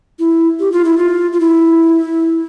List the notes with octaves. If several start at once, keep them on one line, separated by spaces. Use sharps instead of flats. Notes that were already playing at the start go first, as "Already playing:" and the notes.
E4
G4
F4
E4
F4
F4
E4